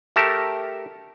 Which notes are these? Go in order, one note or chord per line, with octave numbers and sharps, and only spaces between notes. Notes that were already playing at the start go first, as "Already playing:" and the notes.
A3 G4 A#4 A5